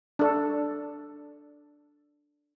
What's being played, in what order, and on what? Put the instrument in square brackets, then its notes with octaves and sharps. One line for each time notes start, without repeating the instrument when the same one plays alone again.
[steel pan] D4 A4